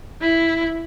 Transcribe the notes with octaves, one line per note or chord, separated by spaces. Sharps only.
E4